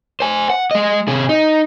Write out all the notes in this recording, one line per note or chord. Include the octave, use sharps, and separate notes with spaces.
C5 G#5
F#5
G#3 D#5
C3 G#4
D#4